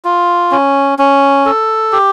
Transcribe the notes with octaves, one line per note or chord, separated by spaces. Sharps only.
F4
C#4
C#4
A4
G4